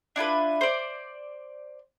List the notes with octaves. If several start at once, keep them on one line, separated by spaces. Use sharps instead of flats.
D4 E4 F4 B4
C5 D5